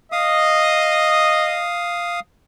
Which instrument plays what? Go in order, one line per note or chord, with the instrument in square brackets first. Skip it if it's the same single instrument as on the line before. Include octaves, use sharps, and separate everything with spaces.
[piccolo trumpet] D#5 [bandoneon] F5 D#6